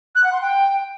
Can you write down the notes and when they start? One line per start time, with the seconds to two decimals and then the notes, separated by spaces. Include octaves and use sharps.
0.15 F#6
0.23 F#5
0.32 C6
0.41 G5